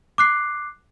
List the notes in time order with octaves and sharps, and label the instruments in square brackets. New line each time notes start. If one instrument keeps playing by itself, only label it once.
[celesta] D6 F#6 C7